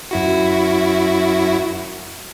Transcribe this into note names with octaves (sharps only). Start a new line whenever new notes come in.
F#2 E4 F#4